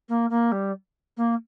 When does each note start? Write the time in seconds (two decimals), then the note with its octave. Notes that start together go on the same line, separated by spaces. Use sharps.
0.09 A#3
0.30 A#3
0.52 G3
1.17 A#3